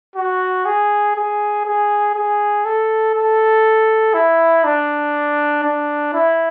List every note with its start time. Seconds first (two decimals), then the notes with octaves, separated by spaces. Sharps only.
0.16 F#4
0.65 G#4
1.16 G#4
1.65 G#4
2.14 G#4
2.65 A4
3.15 A4
4.14 E4
4.64 D4
5.63 D4
6.14 E4